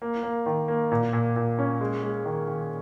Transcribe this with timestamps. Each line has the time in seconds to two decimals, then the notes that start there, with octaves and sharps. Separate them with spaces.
0.02 A#3
0.23 A#3
0.46 D#3
0.68 A#3
0.92 A#2
1.13 A#2
1.36 A#2
1.59 C#4
1.81 G#3
2.03 G#3
2.25 D#3
2.48 D#3